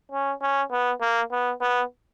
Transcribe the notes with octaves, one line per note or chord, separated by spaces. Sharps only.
C#4
C#4
B3
A#3
B3
B3